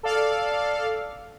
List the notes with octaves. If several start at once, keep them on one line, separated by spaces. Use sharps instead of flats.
A4 D5 F5